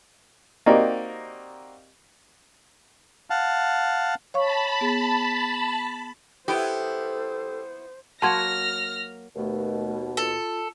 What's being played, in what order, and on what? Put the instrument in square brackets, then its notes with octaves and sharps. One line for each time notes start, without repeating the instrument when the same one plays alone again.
[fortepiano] A#3 C4 D#4 F#4 G4 D5
[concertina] F5 F#5 A5
[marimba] C#5 F5 C#6 [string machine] A5 B5
[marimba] B3 G#4
[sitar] B3 E4 [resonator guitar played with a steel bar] G4 [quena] A4 [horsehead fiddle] C5
[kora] F#3 A#3 F#4 [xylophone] A5 C6 G#6 [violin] F6 A#6
[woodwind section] D#2 B2 [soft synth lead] A3
[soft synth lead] F4 [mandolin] A4